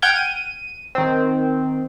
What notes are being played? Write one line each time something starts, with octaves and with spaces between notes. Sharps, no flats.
F#5 G5 F6 G6 G#6
D#7
D#3 C4